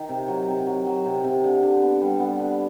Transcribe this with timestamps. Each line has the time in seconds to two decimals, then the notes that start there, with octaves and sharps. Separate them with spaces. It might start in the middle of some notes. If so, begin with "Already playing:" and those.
Already playing: D#3
0.09 C3
0.28 F#3
0.48 C3
0.67 F#3
0.87 F#3
1.06 C3
1.24 C3
1.44 D3
1.63 D3
1.82 B3
2.01 G3
2.20 B3
2.40 D3